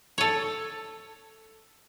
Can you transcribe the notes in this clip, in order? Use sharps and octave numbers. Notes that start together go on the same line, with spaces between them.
A4 C#5